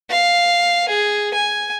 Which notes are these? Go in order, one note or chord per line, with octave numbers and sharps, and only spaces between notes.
F5
G#4
G#5